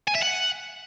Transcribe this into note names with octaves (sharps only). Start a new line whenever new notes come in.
G#5
E5
F#5